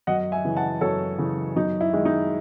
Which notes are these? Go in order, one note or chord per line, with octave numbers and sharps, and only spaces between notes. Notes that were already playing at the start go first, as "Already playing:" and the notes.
F#2 D#5 F#5
E5 G#5
C#3 E3
F#5 A5
F#2 A4 C#5
C#3 E3
F#2 D#4
E4
D#3 G#3
D#4